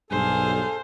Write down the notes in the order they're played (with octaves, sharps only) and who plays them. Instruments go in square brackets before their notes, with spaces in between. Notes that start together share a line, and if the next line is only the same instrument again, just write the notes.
[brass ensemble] B1 G2 [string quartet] G#4 F5 [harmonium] A4 [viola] C5